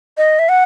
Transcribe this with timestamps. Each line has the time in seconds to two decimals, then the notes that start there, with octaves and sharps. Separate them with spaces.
0.18 D#5
0.39 E5
0.49 F#5